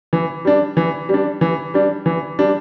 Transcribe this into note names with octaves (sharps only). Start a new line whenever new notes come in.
E3
G3 D4
E3
G3 D4
E3
G3 D4
E3
G3 D4